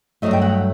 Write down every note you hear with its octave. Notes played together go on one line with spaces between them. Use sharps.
G2 F#3 A3 D#5
G5
F#5